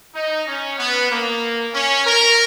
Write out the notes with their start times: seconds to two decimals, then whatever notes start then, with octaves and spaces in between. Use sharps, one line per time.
0.15 D#4
0.47 C#4
0.78 B3
1.10 A#3
1.74 C#4
2.05 A#4